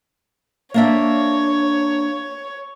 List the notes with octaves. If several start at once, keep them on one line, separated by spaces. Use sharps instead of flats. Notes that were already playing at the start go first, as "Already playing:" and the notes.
A#3 D4 C#5 E5